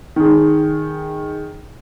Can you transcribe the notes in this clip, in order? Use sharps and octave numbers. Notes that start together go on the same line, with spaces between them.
D#3 G#4